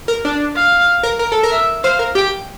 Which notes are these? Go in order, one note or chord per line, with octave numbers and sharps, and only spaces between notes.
A#4
D4
F5
A#4
A#4
A4
A#4
E5
C5 F5
A#4
G4 G5